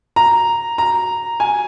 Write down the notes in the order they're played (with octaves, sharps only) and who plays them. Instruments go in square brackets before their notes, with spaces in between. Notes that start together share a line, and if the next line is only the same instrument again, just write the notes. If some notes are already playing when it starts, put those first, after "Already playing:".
[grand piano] A#5
A#5
G#5